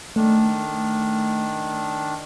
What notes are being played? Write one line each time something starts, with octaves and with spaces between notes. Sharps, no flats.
D#3 A3 D4